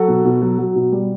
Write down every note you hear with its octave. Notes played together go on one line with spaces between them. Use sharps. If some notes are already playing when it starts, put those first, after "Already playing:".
Already playing: F#3 F#4 A4
B2
B2
F#3
F#3
B2
G3